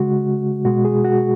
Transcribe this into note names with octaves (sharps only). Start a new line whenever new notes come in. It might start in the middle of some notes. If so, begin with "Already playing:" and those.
Already playing: C#3 G#3 F#4
B2 G#3 F#4
G#4
F#4